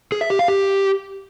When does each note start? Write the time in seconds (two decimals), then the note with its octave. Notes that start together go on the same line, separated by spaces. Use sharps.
0.12 G#4
0.21 E5
0.30 G4
0.39 F5
0.48 G4